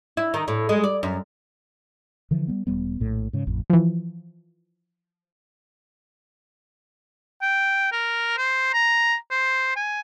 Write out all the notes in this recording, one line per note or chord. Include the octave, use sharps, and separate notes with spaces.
E4
D#3
A2
G#3
D5
F#2
D3 E3 F3
G3 G#3 B3
E1 F2 G3 B3
A#1 A2
G#2 C#3
A1 F2
E3 F3
G5
A#4
C5
A#5
C5
G#5